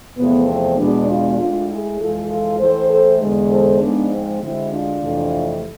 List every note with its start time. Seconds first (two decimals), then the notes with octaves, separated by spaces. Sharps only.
0.17 E2 C3 F3 A3 B3
0.48 C4
0.78 E2 B2 G#3 B3 D4
1.08 D4 F4
1.38 A2 G#3 D4 F4
1.68 E4 G#4
1.99 F2 E3 G#3 F4 A4
2.29 F4 A4
2.60 A2 E3 A3 A4 C5
2.89 A4 C5
3.19 E2 D3 G#3
3.50 A4 C5
3.81 G#2 F3 G#3 B3 D4
4.11 C4
4.40 D2 D3 G#3 C4 E4
4.71 D4 F4
5.01 F2 C3 E3 A3